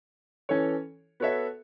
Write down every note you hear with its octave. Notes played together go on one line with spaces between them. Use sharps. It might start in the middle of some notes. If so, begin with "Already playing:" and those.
E3 C#4 A4 C#5
B3 F#4 A4 C#5 E5